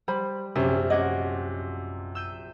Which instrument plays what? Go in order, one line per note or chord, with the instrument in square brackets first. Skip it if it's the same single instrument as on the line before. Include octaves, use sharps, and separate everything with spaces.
[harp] G3 [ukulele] C5 B5
[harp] A#1 F#2 [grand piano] C3 [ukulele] C#4
[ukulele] C#4 D#5 [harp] F#5 D6 G#6
[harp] E6 G6 D#7